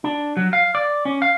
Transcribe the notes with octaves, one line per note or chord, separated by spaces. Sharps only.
D4
F#3
F5
D5
C#4
F5